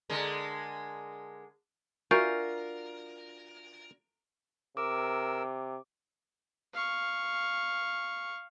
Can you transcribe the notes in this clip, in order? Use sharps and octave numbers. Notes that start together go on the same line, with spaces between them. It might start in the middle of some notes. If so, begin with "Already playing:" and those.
D3 G#3 A#4
D4 F4 F#4 A#4 E5 G#5 C#6 G6
C3 A#4 D6 E6
F5 C#6